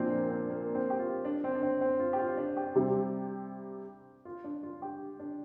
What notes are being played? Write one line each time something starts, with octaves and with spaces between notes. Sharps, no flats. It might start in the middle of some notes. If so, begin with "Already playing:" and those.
Already playing: A#2 F3 C4 D4 F4
A#3
C4
A#3
C4
G4
F4
D4
C4
D4
C4
C4
F4
G4
F4
D4
G4
C3 G3 C4
F4
D4
F4
G4
D4